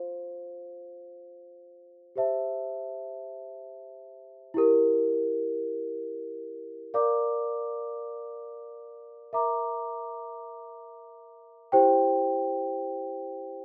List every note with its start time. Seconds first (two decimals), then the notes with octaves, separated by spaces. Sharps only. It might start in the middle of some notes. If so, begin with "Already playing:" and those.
Already playing: F4 C5 F5
2.16 G4 C5 E5 A5
4.54 E4 G4 A#4
6.94 A#4 D5 F5 A#5 D6
9.33 A#4 E5 A#5 D6
11.72 E4 G4 C5 G5